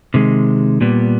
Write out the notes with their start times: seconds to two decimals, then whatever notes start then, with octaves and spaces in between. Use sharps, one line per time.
0.14 C3 D#3 G#3
0.81 A#2 G3 B3